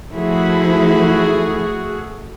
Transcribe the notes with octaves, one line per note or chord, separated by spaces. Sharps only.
F3 A3 E4 F#4 G#4